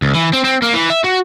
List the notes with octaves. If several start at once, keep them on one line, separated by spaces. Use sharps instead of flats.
C#2
E3
C4
C4
A#3
E3
E5
F#4